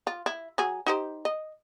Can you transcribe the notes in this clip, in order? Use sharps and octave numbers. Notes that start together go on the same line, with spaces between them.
F4
E4
F#3 G#4
D#4 G4 C5
D#5